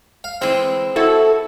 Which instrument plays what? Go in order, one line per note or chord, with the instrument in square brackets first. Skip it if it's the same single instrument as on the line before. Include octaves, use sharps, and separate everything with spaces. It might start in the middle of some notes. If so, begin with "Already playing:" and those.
[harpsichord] F5
[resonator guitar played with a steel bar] E3 G#3 [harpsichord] C4
[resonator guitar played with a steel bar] E4 F#4 [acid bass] A4